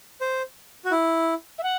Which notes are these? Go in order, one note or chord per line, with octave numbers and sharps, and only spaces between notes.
C5
F#4
E4
E5
F#5